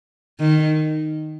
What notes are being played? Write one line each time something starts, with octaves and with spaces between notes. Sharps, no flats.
D#3